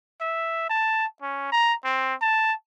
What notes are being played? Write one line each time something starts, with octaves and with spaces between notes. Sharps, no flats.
E5
A5
C#4
A#5
C4
A5